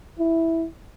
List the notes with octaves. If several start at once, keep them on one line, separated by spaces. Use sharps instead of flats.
E4